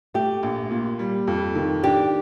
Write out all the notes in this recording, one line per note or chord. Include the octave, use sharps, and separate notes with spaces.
A3 G4
A#1
A#2
G3
F2
D#3
D4 G4